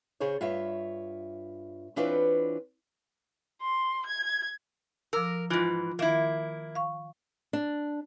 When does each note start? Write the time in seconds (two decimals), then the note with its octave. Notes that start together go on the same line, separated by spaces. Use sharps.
0.20 C#3 G#4 C5 C#5
0.41 G2 F4 C#5 E5
1.96 E3 C4 D4 F4 B4 C#5
3.62 C6
4.06 G#6
5.13 F3 A#4 D6 E6
5.50 G#2 E3 F4
5.99 D#3 A#3 E4 E5
6.75 F5 C#6
7.53 D4